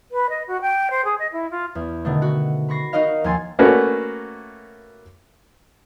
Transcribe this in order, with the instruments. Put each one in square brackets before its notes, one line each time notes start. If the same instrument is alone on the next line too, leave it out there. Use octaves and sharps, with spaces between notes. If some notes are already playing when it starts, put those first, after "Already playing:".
[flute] B4
D#5
F#4
G5
C5
G#4
D#5
E4
F4
[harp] E2
B2 D3 D#3 A3
F#4
B5 C#6 A#6 C7
D#4 F#4 A#4 D#5 F5
D#2 F3 G#5 C6 A6
[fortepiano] A3 A#3 C#4 F#4 B4